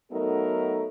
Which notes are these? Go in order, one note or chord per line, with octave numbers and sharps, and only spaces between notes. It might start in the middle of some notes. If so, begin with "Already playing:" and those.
F#3 A3 B3 D#4 A4 A#4